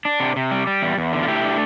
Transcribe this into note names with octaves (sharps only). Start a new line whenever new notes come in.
D4
C3
C3
G3
G3
E2
E2
D3
F4
A3 E4 G4
D4